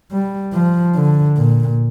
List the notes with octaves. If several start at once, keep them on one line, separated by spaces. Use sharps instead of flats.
G3
F3
D3
A#2